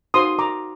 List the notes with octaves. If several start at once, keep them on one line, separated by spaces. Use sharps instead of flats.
D#4 F#4 C5 C6 D#6
A#5 D6